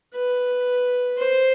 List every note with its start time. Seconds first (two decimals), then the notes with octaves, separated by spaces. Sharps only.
0.14 B4
1.18 C5